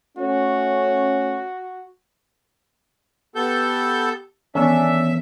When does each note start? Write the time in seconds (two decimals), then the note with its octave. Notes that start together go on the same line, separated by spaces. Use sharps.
0.18 A3 C#4 F#4 C#5
3.36 B3 G4 A4 G6
4.55 D#3 E3 B3 C#4 D4 E5